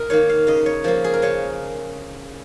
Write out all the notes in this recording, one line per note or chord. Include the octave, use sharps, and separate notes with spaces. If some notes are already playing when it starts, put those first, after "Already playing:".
Already playing: A#4 D#5
D#3 A#3 C#5
F5
C#3 D#5
C#5
F3 A#3 A#4
G#4
A#4
C#3 C#5